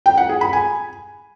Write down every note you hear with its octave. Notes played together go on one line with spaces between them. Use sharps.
G5
F#5
G#4
B5
G#5